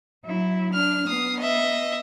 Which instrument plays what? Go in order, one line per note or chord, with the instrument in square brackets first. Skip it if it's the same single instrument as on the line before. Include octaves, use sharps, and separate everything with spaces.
[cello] F#3 E4
[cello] D4 [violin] F6
[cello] B3 [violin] D#6 C7
[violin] D#5 E5